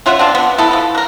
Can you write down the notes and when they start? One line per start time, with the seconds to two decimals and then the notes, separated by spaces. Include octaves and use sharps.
0.06 C#4 F4 E5 F#5
0.19 C4 D4 F4
0.35 B3
0.58 B3 E4 A4
0.71 E3 F3
0.95 F#4 A#4